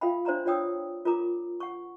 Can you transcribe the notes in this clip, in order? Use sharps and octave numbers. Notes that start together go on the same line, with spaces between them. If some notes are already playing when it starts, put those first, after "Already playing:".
F4 A4 E5 F5 G5 B5
D4 C5 D5 E5 A#5 C6
F4 C#5 D5 G5 D#6 E6
F4 A#4 A#5 D6
F#5 C#6